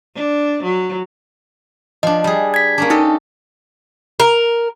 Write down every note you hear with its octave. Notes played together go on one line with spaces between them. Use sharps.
D4
F#3
F3 D4 D#5
G3 G#4
G#6 B6
A#3 C#4 D4
D#4 G4 A4 D#5
A#4